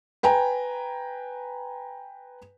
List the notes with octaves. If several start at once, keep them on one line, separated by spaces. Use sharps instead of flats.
B4 G5 G#5 A#5